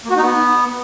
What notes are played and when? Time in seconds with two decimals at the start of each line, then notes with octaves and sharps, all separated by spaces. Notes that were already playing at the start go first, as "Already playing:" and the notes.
0.05 A#3
0.11 F#4
0.16 D#4
0.22 B3